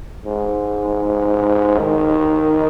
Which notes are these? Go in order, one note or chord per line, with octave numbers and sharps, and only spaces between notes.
G#2
D#3